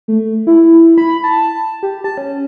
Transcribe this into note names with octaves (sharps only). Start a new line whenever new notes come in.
A3
E4
B5
A5
G4
A5
C#4